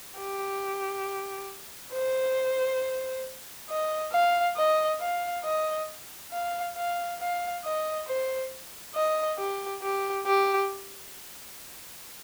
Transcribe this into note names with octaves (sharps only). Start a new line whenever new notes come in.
G4
C5
D#5
F5
D#5
F5
D#5
F5
F5
F5
D#5
C5
D#5
G4
G4
G4